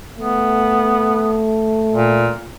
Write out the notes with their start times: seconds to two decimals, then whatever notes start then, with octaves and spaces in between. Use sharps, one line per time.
0.18 A3 B3
1.93 A#2